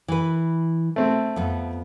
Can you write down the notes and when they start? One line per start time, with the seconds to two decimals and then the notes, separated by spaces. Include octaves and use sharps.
0.08 E3 B4
0.96 A3 C4
1.36 F2 B3